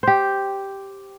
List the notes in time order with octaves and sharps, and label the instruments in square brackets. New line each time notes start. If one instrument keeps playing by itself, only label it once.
[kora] G4 C5